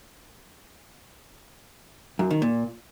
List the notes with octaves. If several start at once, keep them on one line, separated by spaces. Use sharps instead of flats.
F#2
D#3
A#2